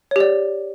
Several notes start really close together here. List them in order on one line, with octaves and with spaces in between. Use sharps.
C#5 G4 D5